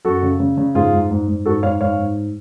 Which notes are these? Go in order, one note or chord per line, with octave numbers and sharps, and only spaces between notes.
F#2 F#4 A4
C#3
C#3
C#3
G#2 F4 G#4
G#2
G#2
G#2
G#2 F#4 A4
G#2 C#5 F5
G#2 C#5 F5
G#2